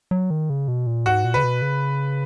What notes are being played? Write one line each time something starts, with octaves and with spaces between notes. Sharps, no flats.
F#3
D#3
C#3
B2
A#2
G#2 F#4
A#2
C#3 B4
B2
C#3